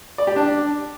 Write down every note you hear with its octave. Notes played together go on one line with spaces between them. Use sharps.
D5
G4
D4